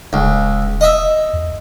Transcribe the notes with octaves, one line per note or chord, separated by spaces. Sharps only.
D#1 C#2
D#5 E5
E2